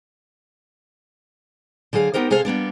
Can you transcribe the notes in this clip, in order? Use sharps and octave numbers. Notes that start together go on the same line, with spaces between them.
D3 F#3 G#4 F5
B3 D#4 G4 A#4 C5
C3 G#4 A4 C5 F5
G3 A#3 B3 D4